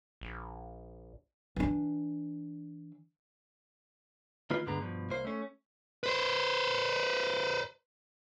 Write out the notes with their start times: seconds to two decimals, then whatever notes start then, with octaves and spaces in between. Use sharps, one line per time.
0.21 A#1
1.56 E3 D4
4.50 D#3 A#3 F4 B4
4.66 D2 G2 D3 G#3 B3 A#5
4.81 G2 B2 F3
5.09 C2 A#3 C5
5.25 A3 C#4
6.03 B4 C5